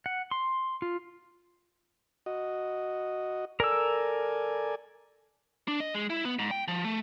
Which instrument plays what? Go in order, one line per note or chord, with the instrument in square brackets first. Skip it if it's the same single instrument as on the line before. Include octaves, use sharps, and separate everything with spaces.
[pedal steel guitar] F#5
C6
F4
[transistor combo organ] F#4 D#5
[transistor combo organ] A4 D5 G#5 [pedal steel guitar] A#4 E6
[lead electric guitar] D4
D#5
G#3
E4
B3
G#2
G5
F3
A3